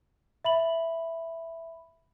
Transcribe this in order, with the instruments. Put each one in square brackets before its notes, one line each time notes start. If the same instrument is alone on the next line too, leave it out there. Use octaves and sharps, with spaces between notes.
[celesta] E5 B5 F#7